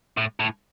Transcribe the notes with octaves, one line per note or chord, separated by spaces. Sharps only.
A2
A2